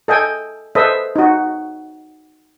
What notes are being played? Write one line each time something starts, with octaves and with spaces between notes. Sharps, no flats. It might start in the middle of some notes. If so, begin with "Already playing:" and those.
A4 D#5 G5 G#5
A4 B4 C5 D#5 E5
D#4 F#4